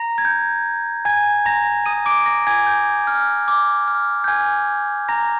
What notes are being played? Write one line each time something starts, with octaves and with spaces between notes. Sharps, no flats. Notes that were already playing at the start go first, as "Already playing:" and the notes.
Already playing: A#5 A#6
G#6
G6
G#5 G#6
A#5 A#6
D#6 D#7
D6 D7
A#5 A#6
G#5 G#6
G6
F6
D6
F6
G6
G#5 G#6
A#5 A#6